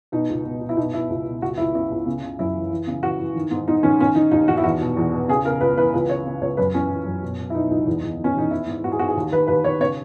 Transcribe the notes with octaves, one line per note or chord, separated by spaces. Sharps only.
B2 D#4
C#2
B2
B2
E4
B2 D#4
B2 E4
C#2
B2
C#2 F#4
C#2 E4
C#3 E4
C#2
C#3
C#3
F#2 E4
E3
E3
C#3
E3 F#4
E3
D#3
G#2
G#2 D#4
D#3 C#4
D#3 C#4
D#3 D#4
D#2 D#4
D#3 F#4
E4
E2 F#4
B2
E2
B2
C#3 G#4
C#3 A#4
C#2 B4
E3 B4
C#2
C#3 C#5
C#3
C#2 C#5
F#2 B4
E3 C#4
E3
F#2
B2
B2
E4
B2 D#4
C#2 D#4
E2
E2
D#3
C#4
E2 D#4
E3 E4
G#2
G#2 F#4
G#4
G#2 F#4
G#4
D#2
D#3 B4
D#2 B4
D#3 C#5
C#3 C#5